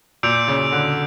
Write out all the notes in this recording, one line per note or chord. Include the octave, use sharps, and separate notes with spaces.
A#2 E6 G6 D7 F7
C#3
D3